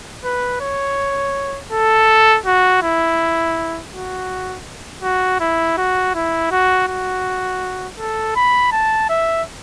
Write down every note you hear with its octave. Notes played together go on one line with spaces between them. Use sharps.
B4
C#5
A4
F#4
E4
F#4
F#4
E4
F#4
E4
F#4
F#4
A4
B5
A5
E5